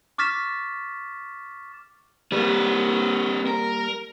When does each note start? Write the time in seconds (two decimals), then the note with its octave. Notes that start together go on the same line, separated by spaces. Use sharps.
0.18 C#6 D6 F6 A6 B6 E7
2.32 G3 A#3 C4 B4
3.47 A#4